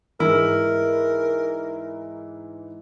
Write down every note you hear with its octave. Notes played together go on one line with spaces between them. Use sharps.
G#2 E3 E4 A#4